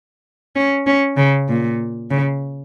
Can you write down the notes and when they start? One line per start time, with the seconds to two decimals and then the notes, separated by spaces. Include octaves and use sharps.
0.56 C#4
0.87 C#4
1.17 C#3
1.49 A#2
2.11 C#3